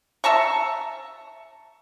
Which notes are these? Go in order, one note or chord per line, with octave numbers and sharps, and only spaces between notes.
E5 A5 A#5 C#6